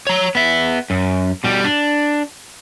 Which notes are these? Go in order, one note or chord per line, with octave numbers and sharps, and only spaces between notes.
C#5 A#5
B3 E5
F#2
B2 G3
D4